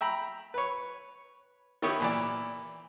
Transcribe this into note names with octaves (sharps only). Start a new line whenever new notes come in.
E5 G5 A#5 B5
B4 C#5
D#3 B3 E4 G4 C#5 D#6
A#2 E3 D5